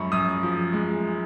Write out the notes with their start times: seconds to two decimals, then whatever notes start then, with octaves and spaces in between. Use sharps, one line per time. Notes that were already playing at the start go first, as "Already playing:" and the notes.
Already playing: F#2 F3 G#3 B5 C#6
0.12 F#2 D#6
0.43 F3
0.73 G#3